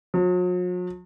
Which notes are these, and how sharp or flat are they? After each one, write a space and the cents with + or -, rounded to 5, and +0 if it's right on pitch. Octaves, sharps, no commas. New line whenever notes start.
F#3 -45